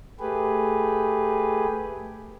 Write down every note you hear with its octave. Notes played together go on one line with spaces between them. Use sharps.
A3 G4 G#4 B4